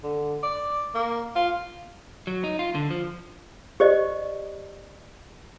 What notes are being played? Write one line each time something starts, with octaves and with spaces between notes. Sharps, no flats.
D3
D5
A#3
F4
F#3
D#4
F4
D3
F3
G4 C5 D5 D#5